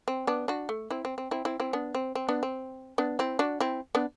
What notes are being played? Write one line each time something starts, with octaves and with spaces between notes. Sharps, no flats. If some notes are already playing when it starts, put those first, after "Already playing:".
C4
B3 D4
D4 F#4
A3
C4 E4
C4
C4
C4 E4
C4 E4
C4 E4
B3 D4
C4
C4
B3 D4
C4
B3 D4
C4 E4
D4 F#4
C4 E4
B3 D4